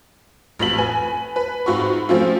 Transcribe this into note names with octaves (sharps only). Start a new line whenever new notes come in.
A1 F2 F4 B6 F#7
B4 G#5
B4
G#2 C4 F4 F#4 B5 C#6
F3 A3 C4 C#4 F4